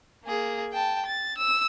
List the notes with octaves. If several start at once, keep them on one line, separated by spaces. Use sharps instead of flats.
A#3 G#4
G5 A5
A6
E6